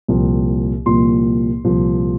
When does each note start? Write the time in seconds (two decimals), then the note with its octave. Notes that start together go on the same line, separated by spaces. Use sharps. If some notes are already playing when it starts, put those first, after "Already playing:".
0.08 C2 A#2 F3 A#3
0.86 C2 A#2 F3 A#3 C6
1.64 C2 A#2 F3 A#3